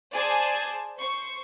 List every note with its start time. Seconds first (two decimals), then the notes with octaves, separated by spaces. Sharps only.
0.14 G#4 C5 D5 G#5 A5 G#6
0.99 C5 C#6